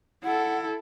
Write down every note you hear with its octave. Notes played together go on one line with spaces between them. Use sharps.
E4 A4 F#5